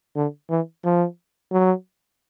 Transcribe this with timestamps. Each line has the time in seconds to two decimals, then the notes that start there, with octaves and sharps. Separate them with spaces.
0.16 D3
0.50 E3
0.84 F3
1.52 F#3